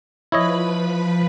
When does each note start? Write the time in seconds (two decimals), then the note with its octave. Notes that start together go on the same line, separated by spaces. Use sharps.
0.32 F3 E4 B4 C#5 D#5 B5